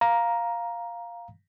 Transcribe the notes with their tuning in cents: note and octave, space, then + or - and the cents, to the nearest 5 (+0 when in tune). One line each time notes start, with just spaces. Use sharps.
F5 +0 A#5 +10